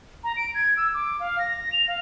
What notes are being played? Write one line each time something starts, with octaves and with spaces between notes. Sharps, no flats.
A#5
D7
G#6
E6
D6
F5
A#6
A#6
F7
F5